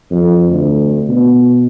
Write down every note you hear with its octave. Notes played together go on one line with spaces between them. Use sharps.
F2
D2
B2